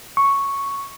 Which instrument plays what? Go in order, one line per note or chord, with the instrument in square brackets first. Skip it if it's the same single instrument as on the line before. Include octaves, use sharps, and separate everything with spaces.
[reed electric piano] C#6